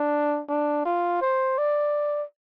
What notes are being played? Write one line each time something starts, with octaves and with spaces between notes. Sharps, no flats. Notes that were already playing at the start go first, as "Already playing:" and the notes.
Already playing: D4
D4
F4
C5
D5